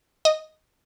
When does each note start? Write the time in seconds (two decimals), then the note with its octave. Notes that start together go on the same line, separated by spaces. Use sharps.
0.25 D#5